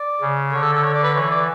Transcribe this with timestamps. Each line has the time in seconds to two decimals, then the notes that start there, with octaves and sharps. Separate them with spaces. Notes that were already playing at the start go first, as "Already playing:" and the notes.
Already playing: D5
0.21 C#3
0.52 D3 C#5
0.62 A4
0.73 A4
0.83 C#5
0.94 D5
1.03 B4
1.14 E3 C#5
1.30 D5